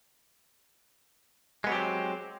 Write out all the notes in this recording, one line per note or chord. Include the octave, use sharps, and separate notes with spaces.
F#3 G#3 B3 C4 G4